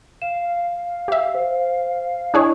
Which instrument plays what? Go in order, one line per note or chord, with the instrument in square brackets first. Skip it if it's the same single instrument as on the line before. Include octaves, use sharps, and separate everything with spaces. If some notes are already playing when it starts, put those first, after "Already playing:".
[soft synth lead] F5 [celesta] E7
[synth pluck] G4 E5
[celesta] C5
[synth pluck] D4 G#4 C#5 [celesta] E4 D#5